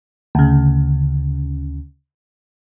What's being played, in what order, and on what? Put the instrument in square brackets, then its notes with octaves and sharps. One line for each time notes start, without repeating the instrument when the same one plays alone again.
[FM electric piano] D2 C#3